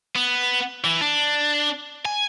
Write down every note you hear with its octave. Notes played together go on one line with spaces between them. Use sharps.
B3
E3
D4
G#5